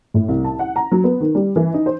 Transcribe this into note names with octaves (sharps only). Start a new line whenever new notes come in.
A2
C2
A5
F#5
A#5
F#3
B3
D#3
G3
E3
D#4
C5